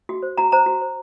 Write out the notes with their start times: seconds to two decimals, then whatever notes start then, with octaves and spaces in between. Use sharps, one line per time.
0.09 F#4
0.23 C5
0.38 F#4 A#5
0.52 C5 A#5
0.66 F#4
0.82 C5